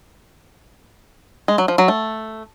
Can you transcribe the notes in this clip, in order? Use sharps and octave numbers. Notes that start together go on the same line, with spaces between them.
G#3
F#3
F3
F#3
A3